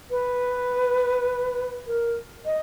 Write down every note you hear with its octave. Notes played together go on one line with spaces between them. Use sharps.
B4
A#4
D#5